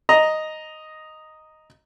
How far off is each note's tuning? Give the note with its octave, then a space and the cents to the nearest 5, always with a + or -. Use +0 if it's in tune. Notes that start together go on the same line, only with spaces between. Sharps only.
D#5 +0 A#5 +0